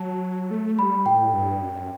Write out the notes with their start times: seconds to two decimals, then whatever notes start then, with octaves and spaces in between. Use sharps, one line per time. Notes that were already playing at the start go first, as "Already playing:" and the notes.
Already playing: F#3 A5
0.51 A3
0.78 G3 B5
1.06 A2 G5
1.33 G2
1.61 F#2